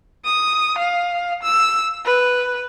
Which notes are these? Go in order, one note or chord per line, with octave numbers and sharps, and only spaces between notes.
D#6
F5
E6
B4